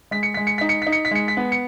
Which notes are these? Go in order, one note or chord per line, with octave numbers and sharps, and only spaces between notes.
G#3 B6
C#7
G#3 B6
C#7
D#4 B6
C#7
D#4 B6
C#7
B6
G#3 C#7
B6
B3
C#7